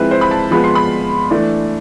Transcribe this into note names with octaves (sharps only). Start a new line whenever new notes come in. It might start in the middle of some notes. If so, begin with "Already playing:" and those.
Already playing: F3 G#3 C4 E4 B4
C5
B5
A5
F3 G#3 B3 B5
C6
B5
E3 A3 D4